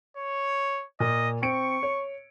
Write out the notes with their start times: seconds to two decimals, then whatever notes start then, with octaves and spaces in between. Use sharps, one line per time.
0.17 C#5
1.00 A#2 D#5
1.42 C4 C#6 C#7 D7
1.83 C#5